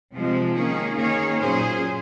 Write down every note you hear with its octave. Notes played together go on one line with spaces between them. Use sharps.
C3 F3 G#3 C4
D#3 A#3 C#4 G#4
D#3 A#3 C#4 G#4 C#5
A#2 F#3 C#4 G#4 C5